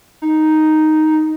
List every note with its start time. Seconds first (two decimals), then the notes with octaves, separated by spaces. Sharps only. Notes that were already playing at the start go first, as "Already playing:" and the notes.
0.22 D#4